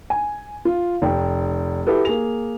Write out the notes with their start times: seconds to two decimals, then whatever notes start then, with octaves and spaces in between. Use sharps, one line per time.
0.10 G#5
0.65 F4
1.02 F1 G5
1.87 E4 F#4 G4 A4 B4
2.05 A#3 G#4 F7